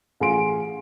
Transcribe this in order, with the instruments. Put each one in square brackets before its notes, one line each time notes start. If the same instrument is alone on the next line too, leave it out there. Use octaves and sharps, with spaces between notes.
[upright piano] A1 G#4 F5 C6 D7